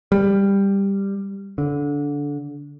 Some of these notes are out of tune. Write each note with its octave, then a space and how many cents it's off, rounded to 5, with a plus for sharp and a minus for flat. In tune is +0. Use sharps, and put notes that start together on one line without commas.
G3 +10
D3 -20